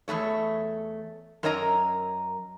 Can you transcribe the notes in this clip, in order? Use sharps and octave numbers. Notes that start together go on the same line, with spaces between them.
E2 G2 A3 C#5
F#2 A#4 C#5 D#5 A5 A#5